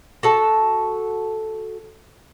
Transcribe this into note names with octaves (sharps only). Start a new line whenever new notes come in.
F#4 A4 A5